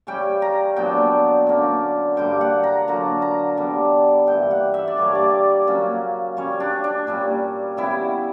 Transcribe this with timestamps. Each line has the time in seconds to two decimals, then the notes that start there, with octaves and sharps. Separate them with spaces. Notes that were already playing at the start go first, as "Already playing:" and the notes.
0.07 C#3 G3 C#4 G5
0.42 A#5
0.76 A#2 F#3 B3 D4 G5
1.47 D3 A#3 C#4
2.17 G2 D3 G3 A#3 G5
2.41 F#5
2.63 A#5
2.88 D3 F#3 A#3 A#5
3.22 A#5
3.57 D3 G3 B3 D4
4.27 G2 E3 A#3 G5
4.51 F#5
4.74 E5
4.88 D5
4.97 G2 D3 G3 A#3 C#5
5.15 D5
5.67 C#3 F#3 A#3 C#4
6.37 C#3 G3 C#4 C#5
6.60 D4
6.84 D4
7.07 A#2 G3 C#4
7.77 C#3 G3 B3 E4